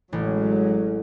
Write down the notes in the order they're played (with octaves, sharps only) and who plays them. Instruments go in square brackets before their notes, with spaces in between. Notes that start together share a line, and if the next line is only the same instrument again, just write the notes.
[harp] A1 [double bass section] F#3 G#3 C#4